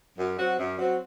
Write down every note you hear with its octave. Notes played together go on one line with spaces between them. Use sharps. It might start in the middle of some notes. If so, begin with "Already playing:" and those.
F#2
F#3 C4 F#4
F#2
F#3 C4 F#4